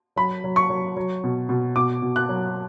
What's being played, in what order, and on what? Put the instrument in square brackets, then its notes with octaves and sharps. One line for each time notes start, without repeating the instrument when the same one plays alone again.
[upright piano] F#3 B5
F#3
C#6
F#3
F#3
B2
B2
B2 D6
B2
F#6
F#3